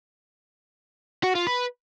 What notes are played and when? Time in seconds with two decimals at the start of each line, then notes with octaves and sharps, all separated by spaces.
1.23 F#4
1.35 F4
1.47 B4